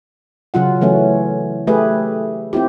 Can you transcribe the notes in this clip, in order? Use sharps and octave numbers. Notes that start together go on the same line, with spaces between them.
C#3 F#3 F4 F#5
E3 F#3 A3 C#4
A3 G4 G#4 B4
C4 E4 F4 G4